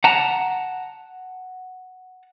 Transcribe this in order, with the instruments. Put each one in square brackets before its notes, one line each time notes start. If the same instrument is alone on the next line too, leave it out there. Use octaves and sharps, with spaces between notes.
[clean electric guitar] F#5 A5 A#5